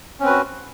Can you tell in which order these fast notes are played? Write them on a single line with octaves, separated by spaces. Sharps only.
C#4 C4 B4 F#4